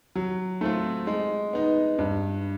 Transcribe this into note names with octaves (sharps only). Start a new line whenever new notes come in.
F#3
A3 C4 F4
G#3
B3 D#4
G2